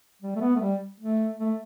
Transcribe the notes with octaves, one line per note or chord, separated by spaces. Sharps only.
G3
A3
B3
A3
G3
A3
A3